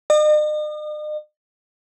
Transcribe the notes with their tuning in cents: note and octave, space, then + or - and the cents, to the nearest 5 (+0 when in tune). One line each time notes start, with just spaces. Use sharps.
D#5 -45